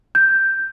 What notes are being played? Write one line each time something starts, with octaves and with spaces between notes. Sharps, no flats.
G6